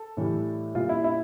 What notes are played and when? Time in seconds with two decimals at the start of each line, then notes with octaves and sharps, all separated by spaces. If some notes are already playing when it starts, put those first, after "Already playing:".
Already playing: A4
0.17 A2 E3 G3
0.75 A#2 G3 F4
0.89 E4
1.04 E4